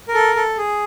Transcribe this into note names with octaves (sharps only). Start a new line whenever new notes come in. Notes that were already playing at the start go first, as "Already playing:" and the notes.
A#4
A4
A4
G#4